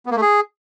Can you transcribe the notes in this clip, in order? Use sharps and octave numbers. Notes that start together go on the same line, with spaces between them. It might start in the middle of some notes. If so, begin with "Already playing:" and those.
B3
A#3
A3
G#4